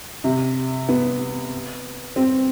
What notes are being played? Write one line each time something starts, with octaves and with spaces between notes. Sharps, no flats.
C3
B3
C4